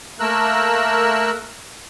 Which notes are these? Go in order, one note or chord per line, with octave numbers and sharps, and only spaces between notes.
A3 A#3 A#4 E6 F#6